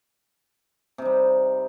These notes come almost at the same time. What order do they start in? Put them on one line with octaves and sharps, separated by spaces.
C3 D#4 G3